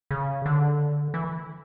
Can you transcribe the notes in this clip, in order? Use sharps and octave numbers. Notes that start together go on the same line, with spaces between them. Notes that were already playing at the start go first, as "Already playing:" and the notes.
C#3
D3
E3